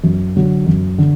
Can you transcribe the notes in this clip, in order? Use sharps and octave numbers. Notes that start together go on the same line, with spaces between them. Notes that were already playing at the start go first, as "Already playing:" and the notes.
F#2
D3 F#3
F#2
D3